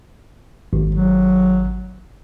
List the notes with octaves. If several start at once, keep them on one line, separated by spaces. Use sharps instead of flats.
G#1
F#3